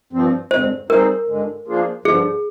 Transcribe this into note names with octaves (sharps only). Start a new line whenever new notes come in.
G2 F3 C4
G2 D3 G#3 C4 C5
G3 C4 D#4 G#4 A#4 C5
G2 D3 G#3
F3 A#3 D4 F4 G#4
G2 D3 F3 G#4